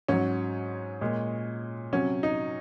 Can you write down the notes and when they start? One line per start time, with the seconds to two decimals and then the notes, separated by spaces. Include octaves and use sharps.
0.08 G#2 F#3 C#4
1.01 A#2 G#3
1.93 C3 F#3 C#4
2.23 D#4